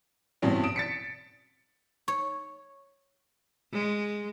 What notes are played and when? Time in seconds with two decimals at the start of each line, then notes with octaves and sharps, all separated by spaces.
0.42 G2 B2 E3 C4 C#4
0.64 D#6 D7 E7
0.76 A6 B6 C#7
2.08 C#5
3.73 G#3